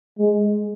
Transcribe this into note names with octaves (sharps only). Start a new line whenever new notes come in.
G#3